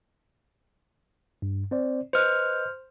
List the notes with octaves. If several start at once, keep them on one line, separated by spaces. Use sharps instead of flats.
G2
C4 C5 D5
B4 C5 D#5 F6 F#6